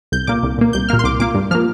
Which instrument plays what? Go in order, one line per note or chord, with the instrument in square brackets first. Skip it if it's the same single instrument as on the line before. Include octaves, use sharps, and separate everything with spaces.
[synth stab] C2 G6
A#2 A#3 D6
C2
A#2 A#3
C2 G6
A#2 A#3 F6
C6
C2 D6
A#2 A#3 D6
G2
F3 A#3 F6